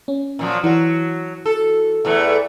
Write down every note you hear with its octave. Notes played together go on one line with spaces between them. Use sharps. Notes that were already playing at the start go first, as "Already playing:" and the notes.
C#4
A#2 F3 F#3
E3 F#3 F#4
A4
E2 E3 A3